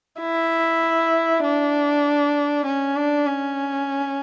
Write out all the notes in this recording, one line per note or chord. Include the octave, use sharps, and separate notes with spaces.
E4
D4
C#4
D4
C#4